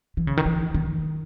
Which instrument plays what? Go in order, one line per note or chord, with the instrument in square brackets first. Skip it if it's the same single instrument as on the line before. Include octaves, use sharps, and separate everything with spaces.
[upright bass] E3
C#3
D#3
E3
D#3